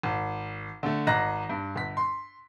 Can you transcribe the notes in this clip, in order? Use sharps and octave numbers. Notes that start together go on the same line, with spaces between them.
G#1
D3 A3
G#1 D#5 A#5 F#6 A#6
G2
G1 B6
C6